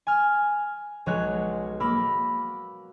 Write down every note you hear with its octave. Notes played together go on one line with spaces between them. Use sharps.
G#5 F6
B1 F#3 G#3 C#5 F#6
A#3 B5 E6